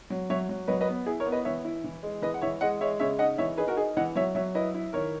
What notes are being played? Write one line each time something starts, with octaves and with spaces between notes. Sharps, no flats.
F#3
F#3 C#5 E5
F#3
F#3 B4 D#5
B4 D#5
B3
E4 G#4
A#4 C#5
B3
B4 D#5
E3 C#5 E5
E4
E3
G#3
E3 B4 D#5
F#5
E3 C#5 E5
G#3 D#5 F#5
G#3 C#5 E5
C#3 C#5 E5
D#4 D#5 F#5
E3 C#5 E5
D#4 G#4 B4
F#4 A#4
D#4 G#4
E3 D#5 F#5
F#3 C#5 E5
F#3 C#5 E5
E4 B4 D#5
E4
D#3 A#4 C#5